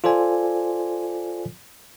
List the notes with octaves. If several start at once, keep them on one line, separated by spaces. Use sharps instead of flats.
F4 A4 C5 D5 G#5